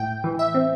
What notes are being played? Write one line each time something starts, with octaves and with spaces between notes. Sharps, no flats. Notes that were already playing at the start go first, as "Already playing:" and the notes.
Already playing: A2 G5
E3
E5
C4